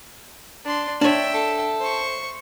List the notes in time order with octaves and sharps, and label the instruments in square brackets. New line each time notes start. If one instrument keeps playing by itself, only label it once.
[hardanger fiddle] D4 C6
[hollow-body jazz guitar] D4 C#5 [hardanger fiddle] E5 G5
[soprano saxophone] A4
[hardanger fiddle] C5 C#6